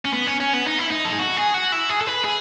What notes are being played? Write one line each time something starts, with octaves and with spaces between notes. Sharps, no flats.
C#4
B3
C#4
C#4
B3
D#4
E4
D#4
A4
G#4
F#4
G#4
F#4
E4
G#4
A4
B4
G#4